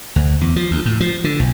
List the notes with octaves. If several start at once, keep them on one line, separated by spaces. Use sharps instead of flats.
D2
E2
F3
D2
A2
F3
D3
B1